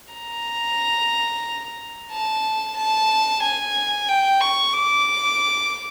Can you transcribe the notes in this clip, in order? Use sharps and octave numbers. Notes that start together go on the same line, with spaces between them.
A#5
A5
A5
G#5
G5
C#6
D6